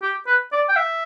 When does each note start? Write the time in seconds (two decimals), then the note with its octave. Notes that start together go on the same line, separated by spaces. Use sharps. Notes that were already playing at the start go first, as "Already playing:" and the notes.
0.02 G4
0.27 B4
0.53 D5
0.69 G5
0.76 E5